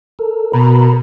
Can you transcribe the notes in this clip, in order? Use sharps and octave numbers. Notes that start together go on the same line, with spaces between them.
A4 A#4
B2 A#4 A#5 B5